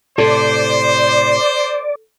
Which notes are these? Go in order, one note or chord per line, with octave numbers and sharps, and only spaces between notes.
A2 C3 A4 C5 D5